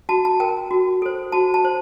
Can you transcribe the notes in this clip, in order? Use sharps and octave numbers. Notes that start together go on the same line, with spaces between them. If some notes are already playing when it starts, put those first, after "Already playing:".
F#4 A5
A5
A#4 G5
F#4
A4 C5
F#4 A5
A5
C5